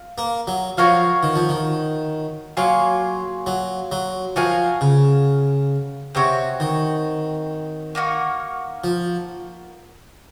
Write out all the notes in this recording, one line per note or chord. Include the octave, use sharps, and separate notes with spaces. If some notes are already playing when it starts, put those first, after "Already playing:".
Already playing: F4
A#3
F#3
F3 F#4 A#4 C#5 F5
D#3
F3
D#3
F#3 A#3 F4 G#4 C#5
F#3
F#3
F3 F#4 A#4 F5 G#5
C#3
C3 C4 F#4 C#5
D#3
A#3 D#4 F#4 A#4
F3